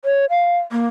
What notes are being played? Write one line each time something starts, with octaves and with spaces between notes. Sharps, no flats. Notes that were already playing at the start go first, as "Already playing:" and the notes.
C#5
F5
A#3